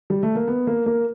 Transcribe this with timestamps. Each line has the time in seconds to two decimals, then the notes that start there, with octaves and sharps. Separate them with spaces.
0.10 G3
0.23 A3
0.35 A#3
0.48 B3
0.67 A#3
0.86 A#3